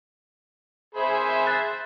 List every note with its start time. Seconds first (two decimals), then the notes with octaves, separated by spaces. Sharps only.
0.95 G#4 C5 E5 G#5 B5
1.47 F#6 A6